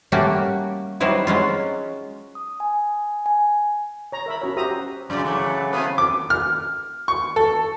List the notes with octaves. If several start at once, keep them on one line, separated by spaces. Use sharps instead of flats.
G3 A3 A#3 C#4 F#4 G4
F#3 G3 C4 D#4 E4 B4
F#3 G#3 C#4 F4
D#6
G#5
G#5
C#5 A#5
A#4 E5 B5
C#4 F#4 C#5
F#4 G4 C5 E5 A#5 D#6
F#2 C#3 F#3 D5
E3 A3 F#5 D6
A3 C4 B4 F5 D#6
D6
F6
C#6
A4